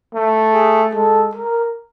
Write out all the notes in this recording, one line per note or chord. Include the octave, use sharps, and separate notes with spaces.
A3
G#4
G#3 A4
A#4